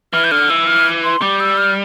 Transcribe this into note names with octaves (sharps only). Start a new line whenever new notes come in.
E3 F6
G6
D3 F6
E3 E6
F6
C6
G3 D6
E6
F6